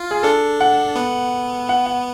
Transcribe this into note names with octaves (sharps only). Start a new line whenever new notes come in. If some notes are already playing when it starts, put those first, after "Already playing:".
Already playing: F4
G#4
D4 A4
F#5
B3
F#5
F#5